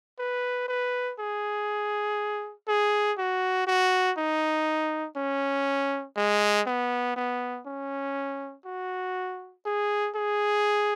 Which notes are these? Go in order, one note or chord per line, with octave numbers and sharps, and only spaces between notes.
B4
B4
G#4
G#4
F#4
F#4
D#4
C#4
G#3
B3
B3
C#4
F#4
G#4
G#4